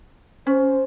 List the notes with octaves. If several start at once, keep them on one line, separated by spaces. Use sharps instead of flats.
C#4 C5